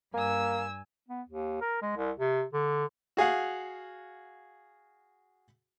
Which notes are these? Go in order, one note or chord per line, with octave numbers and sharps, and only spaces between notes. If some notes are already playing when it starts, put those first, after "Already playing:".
G2 A#3 G#5 E6
B3
D#2
A#4
G#3
C2
C3
D3
F#4 G#4 F5 F#5